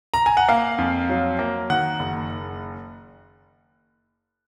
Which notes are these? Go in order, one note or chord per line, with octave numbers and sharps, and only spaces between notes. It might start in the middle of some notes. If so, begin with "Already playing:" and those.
A#5
G#5
F#5
A#3 F5
F2
F#3
A#3
D#3 F#5
F#1